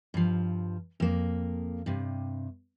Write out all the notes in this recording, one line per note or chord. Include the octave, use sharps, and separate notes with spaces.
G2 F3
F2 A#3
G2 C3